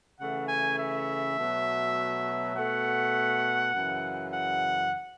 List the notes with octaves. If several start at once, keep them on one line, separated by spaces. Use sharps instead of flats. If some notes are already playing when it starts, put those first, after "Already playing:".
C#3 E3 A3 F#5
G#5
E5
B2 F#3 A3
B2 A3 F#5
F#2 C#3 E3
F#5